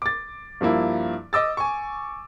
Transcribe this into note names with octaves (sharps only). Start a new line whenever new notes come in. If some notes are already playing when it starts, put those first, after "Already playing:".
D6 A6
G2 F3 A#3 E4
D#5 D6 E6 A6
G#5 C#6